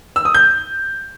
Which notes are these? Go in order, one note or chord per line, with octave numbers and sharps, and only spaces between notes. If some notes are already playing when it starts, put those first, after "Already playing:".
E6
D#6
G6